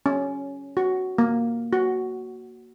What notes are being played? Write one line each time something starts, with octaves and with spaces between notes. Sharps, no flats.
C#4
F#4
A#3
F#4